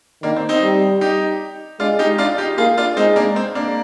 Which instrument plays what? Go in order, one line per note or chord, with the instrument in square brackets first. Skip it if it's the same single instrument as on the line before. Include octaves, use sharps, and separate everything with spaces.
[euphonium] D#3 [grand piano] A#3 D4
[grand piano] C4
C4 D#4
[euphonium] G3
[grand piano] D#4 G4
[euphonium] G#3 [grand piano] D4 F4
[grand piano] D#4 G4
D4 F4
D#4 G4
[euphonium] A#3 [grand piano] F4 G#4
[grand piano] D4 F4
[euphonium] G#3 [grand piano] C4 D#4
[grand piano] A#3 D4
C4
A#3 D4